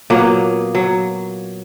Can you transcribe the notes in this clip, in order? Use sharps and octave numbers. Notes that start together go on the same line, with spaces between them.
A#2 F#3 A#3 B3
F#3